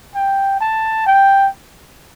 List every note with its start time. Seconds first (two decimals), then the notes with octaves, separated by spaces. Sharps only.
0.15 G5
0.61 A5
1.06 G5